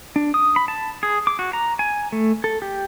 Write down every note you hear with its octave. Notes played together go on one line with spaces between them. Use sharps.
D4
D#6
B5
A5
G#4
D6
F#4
A#5
G#5
A3
A4
G4